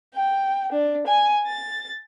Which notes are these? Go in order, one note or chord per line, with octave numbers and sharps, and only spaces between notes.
G5
D4
G#5
A6